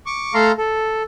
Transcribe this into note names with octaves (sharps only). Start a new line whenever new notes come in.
C#6 D6
A3 A4 F5 A#5 C6
A4